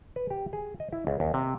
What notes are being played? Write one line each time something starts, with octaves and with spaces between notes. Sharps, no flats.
B4
G4
G#4
D#5
E4
C#2
D#2
C3